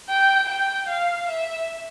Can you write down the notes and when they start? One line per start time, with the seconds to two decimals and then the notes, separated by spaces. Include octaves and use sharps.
0.10 G5
0.49 G5
0.88 F5
1.29 E5